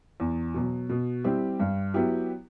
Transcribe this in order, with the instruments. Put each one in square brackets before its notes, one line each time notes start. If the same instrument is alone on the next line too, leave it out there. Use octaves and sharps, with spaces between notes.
[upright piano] E2
B2 F#3
B2
G3 C4 E4 G4
G2
F#3 B3 E4 G4